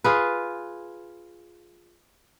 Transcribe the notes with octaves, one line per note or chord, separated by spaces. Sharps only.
F4 G#4 B4